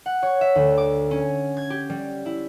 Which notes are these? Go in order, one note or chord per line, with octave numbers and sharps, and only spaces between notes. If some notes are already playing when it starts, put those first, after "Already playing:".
F#5
C#5
E5
D2
D6
C#4
G#6
G4
G3
E4